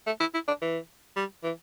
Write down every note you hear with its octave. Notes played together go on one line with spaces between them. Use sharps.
A3
E4
E4
D4
E3
G3
E3